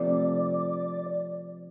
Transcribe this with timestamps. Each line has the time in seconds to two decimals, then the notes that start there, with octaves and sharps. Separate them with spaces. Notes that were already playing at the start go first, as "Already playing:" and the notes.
Already playing: C3 F3 A3 D5